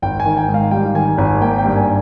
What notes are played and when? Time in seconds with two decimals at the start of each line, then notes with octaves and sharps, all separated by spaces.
0.02 G#1 G5
0.20 G#5
0.26 D#3
0.37 G5
0.48 G#2
0.54 F5
0.71 G3 G5
0.94 D#3 G#5
1.18 G#1 G#5
1.41 A#3 G5
1.58 G5
1.65 G2
1.76 G#5